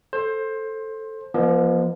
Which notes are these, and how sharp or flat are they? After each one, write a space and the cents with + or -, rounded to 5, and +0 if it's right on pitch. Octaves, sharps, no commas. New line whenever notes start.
A4 +0 C5 +20
F3 -25 A#3 +40 D#5 -20